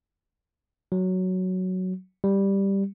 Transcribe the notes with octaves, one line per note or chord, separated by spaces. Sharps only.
F#3
G3